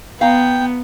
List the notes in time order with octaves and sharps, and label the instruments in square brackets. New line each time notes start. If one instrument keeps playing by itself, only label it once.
[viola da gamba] B3 [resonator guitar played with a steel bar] F5 A#5 [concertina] G5